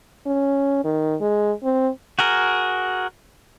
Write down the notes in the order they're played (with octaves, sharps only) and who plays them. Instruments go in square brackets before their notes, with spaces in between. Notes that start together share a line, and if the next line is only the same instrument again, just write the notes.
[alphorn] C#4
D#3
G#3
C4
[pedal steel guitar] F#4 G#4 A#4